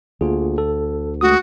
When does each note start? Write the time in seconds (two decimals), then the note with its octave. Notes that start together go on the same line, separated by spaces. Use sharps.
0.21 D2 A#3 F4 G#4
0.58 A4
1.21 G#3 A3 F#4 D#6